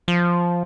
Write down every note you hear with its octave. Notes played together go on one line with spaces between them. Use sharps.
F3